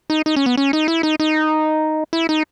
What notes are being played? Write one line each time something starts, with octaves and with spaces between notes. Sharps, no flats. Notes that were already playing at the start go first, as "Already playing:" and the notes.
D#4
D#4
C#4
B3
C#4
D#4
E4
D#4
D#4
E4
D#4